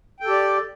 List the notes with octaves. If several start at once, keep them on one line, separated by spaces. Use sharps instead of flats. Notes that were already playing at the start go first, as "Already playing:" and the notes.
G4 A4 D5 G5